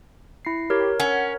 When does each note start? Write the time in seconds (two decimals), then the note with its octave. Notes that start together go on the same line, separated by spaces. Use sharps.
0.45 E4 C7
0.70 G4 A#4 C#5
1.00 C#4 F#5